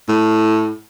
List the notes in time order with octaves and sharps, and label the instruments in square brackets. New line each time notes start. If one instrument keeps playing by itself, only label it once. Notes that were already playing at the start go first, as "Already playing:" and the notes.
[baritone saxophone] A2